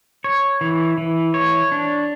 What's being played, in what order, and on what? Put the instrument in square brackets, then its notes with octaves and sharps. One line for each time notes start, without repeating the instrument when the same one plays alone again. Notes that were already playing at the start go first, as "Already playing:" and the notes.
[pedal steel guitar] C#5
E3
E3
C#5
D4